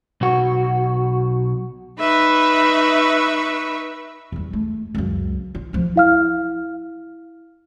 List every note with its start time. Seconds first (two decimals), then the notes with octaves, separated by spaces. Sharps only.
0.21 B1 F#4
1.99 D#4 B4 E5 B5 C#6
4.32 E2 G3
4.53 A3
4.95 C#2 F#2
5.55 F4
5.73 D2 F3
5.96 E4 F5 F6